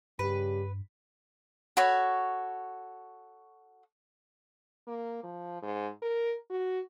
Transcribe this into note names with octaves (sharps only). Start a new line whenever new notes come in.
G2 C#3 G3 G4 B4
F#4 A4 C#5 B5
A#3
F3
G#2
A#4
F#4